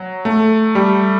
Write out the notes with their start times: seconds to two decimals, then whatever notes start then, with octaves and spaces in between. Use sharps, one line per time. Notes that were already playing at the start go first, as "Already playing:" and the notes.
Already playing: F#3
0.25 A3
0.75 G3